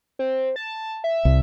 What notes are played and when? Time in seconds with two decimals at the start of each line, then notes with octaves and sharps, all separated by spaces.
0.19 C4
0.56 A5
1.04 E5
1.25 C2